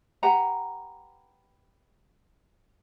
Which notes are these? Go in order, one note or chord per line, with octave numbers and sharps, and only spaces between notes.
G4 B4 F#5 A#5